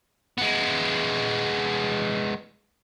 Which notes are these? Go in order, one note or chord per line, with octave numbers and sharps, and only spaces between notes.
G#3 B3